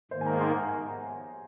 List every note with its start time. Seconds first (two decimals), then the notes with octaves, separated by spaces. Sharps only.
0.11 G#2 D#3 A#3 C5
0.21 G#5
0.26 A#5
0.41 C6
0.55 F#5
0.68 G#5